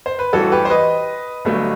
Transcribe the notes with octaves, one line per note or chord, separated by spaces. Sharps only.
C5
B4
A1 G2 E3 G3 F#4 A4
G4 B4
C5
B4 D#5
G1 G2 F#3 A3